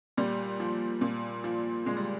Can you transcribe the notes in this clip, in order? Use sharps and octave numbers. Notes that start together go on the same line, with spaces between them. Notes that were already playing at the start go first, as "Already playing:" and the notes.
A#2 G3
F3
A#2
F3
A#2 G#3
G3